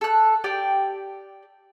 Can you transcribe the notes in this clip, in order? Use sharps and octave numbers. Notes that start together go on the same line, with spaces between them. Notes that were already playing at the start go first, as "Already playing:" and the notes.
A4 F#6
G4 D5 G5